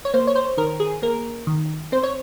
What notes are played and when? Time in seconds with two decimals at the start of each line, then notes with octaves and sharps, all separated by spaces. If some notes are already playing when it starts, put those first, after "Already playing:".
0.05 C#5
0.14 A#3 C5
0.27 C#5
0.36 C5
0.57 D#3 A#4
0.80 G#4
1.02 A#3 A#4
1.47 D#3
1.92 C4 C5
2.03 C#5